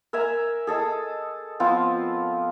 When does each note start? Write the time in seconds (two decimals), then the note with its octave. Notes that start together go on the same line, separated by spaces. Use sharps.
0.13 A#4 E5 G#5 A#5
0.67 G#4 A4 D#5
1.60 F3 B3 C4 F4